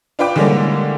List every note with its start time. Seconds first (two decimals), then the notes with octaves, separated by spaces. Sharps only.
0.19 D4 F4 B4 G5 D6
0.36 D3 E3 G3 G#3 A#3 C#4